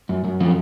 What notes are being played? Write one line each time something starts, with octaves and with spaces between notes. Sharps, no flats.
F#2
F#2
F3